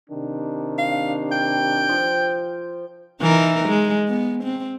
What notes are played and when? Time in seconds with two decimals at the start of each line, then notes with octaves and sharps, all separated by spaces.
0.10 C3 D#3 D4
0.78 F5
1.32 G5
1.89 F3
3.21 E3 D#4 A#4
3.69 G#3
4.08 B3
4.43 C4